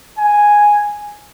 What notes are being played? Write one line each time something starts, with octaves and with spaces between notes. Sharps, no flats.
G#5